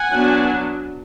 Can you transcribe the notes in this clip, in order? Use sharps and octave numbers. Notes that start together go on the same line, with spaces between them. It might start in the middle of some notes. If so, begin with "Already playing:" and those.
Already playing: F#5 G#5
F#3 B3 D4